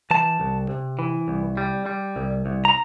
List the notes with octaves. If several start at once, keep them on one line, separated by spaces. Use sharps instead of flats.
E3 A5
C2
C3
E3
C2
G3
G3
C2
C2
A#5